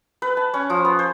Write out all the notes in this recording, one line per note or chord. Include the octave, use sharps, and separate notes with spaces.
B4
A5
C#4
F3
B3
C5